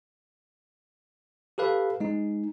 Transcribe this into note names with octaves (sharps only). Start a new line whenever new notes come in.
G4 A4 B4 F5
G#3 D#4